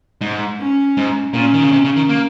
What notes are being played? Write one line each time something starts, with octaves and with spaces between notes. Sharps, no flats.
G#2
C#4
G#2
A#2 C#4
D#3
C#3
C3
C#3
D#3
A#3